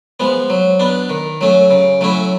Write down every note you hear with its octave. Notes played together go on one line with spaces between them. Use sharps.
F3 G#3 B3
F#3
B3 D4
D#3
F#3 A3 C#4
C#3
F#3 A3 C#4 E4